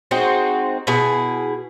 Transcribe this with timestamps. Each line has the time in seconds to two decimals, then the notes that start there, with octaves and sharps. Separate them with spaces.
0.11 G#3 C4 D#4 F#4
0.87 B2 E4 G#4